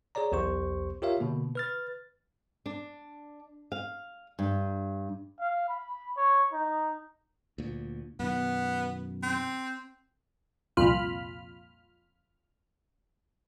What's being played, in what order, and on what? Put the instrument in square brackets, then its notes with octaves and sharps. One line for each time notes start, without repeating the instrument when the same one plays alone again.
[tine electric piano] G#4 C#5 D5 A#5
B1 E2 G4 C5 C#6
F4 G4 A#4 C#5 E5 F5
B2 D3 A#3
B4 F6 A6
[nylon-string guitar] D4
F5
G2
[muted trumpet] F5
B5
C#5
D#4
[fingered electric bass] D2 A#2
[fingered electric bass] F#2 B2 D#3 [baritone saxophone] B3
[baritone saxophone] C4
[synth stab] C2 F2 A#2 F4 B5 F6